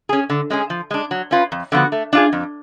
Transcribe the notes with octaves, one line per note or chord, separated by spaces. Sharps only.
C#4 G#4
D3
G#3 C#4 G#4
F3
G#3 D4
F#3
C#4 F4 B4
F2
D3 F3 B3 F#4
A3
D4 F4 G#4
F2